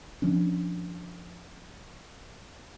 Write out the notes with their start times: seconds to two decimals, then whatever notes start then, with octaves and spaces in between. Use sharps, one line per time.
0.22 F3 C#4 D4